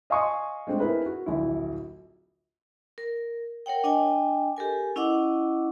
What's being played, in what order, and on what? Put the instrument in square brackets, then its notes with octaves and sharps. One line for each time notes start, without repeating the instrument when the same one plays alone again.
[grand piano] D#5 F5 G#5 C6 C#6 D#6
G#3 A3 C4 D4 F4
C4 E4 G#4 A#4 B4
F#4
D1 A#1 E4
[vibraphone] A#4
A#4 C#5 F#5 G5
D4 D#5 G5 G#5
G4 A4 A#4 G#5
C#4 E4 D#5 F#5 D6